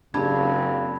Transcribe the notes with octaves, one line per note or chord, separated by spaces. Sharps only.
F#1 C#3 C4 D4 G4 A5 B5 G#6